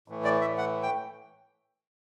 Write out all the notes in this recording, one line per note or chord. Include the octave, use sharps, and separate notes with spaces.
A2 E3 A3
D5
E5
F#5
G5